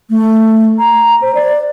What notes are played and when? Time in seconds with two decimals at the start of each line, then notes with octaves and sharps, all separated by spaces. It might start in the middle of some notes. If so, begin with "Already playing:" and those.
0.10 A3
0.79 A#5
1.22 C5
1.35 D5